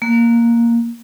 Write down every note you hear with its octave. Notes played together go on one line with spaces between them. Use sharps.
A#3